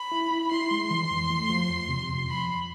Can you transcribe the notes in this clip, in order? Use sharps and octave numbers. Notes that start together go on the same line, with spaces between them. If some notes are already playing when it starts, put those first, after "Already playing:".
Already playing: B5
E4
E4
E4 C6
G#3
E3
F2
A3
F3
F2
C3
F2
F3 B5
F2